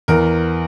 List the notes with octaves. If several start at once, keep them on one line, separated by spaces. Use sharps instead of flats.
E2 A#4